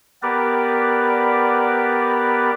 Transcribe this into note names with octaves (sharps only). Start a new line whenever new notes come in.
B3 G4 A#4 B4 D5